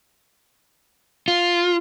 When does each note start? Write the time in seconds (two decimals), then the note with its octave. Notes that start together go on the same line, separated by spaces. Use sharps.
1.28 F4